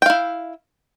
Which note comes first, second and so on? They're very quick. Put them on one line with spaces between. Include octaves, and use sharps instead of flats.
G5 F5 E4